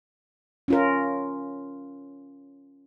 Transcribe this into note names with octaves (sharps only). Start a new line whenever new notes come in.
C#4 F4 A#4